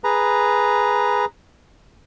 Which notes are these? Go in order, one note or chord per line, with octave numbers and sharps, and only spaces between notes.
G#4 B4 A#5